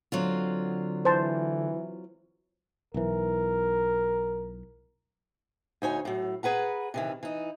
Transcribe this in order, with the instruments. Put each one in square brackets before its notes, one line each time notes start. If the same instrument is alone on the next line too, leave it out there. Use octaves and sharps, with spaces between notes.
[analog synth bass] D3 [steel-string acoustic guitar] F#3 C4 F4
[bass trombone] E3 [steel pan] C5 A5
[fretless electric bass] B1 E3 [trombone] A#4
[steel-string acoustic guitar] D2 D#4 C#5 G#5
A2 F#3
G#4 B4 F#5 A#5
C3 D#3 E3
E3 D#4